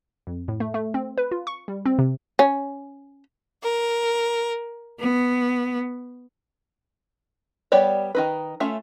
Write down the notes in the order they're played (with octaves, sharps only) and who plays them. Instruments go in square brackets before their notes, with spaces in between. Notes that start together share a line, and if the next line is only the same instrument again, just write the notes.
[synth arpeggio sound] F2
A2
A3
A3
C4
B4
F4
C#6
G3
C4
C3
[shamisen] C#4
[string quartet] A#4
B3
[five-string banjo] G3 B3 G4 C#5 D5
D#3 D#4 B4
A3 C#4 F4 E5